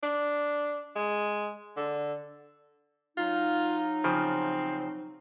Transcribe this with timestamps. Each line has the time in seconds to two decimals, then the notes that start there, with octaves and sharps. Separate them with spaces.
0.03 D4
0.96 G#3
1.77 D3
3.17 F#3 D#4 F4
4.04 C#3 F3 C4